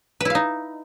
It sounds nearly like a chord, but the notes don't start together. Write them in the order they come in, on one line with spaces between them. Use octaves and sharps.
B4 E4 F5 D#4